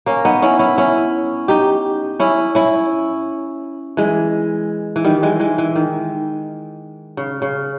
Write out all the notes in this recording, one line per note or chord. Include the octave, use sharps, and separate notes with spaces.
A#3 C#4
B3 D#4
C#4 E4
C#4 E4
C#4 E4
D#4 G4
C#4 E4
C#4 E4
E3 G#3
E3
D#3 G3
E3 G#3
E3 G#3
E3
D#3
C#3
C#3